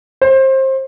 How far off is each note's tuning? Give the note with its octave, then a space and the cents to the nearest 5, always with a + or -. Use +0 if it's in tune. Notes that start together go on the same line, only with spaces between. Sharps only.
C5 +25